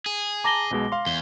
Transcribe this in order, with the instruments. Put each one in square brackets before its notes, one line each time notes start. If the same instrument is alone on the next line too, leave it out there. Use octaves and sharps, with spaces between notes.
[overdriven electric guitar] G#4
[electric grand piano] A5 A#5 [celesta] D6 A#6 G7
[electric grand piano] B1 B2 G#3
F5 C6
[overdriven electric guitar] E2 [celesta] G7